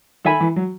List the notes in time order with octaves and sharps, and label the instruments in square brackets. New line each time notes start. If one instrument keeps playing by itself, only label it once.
[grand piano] D#3 [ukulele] A4 E5 G#5 B5
[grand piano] E3
F#3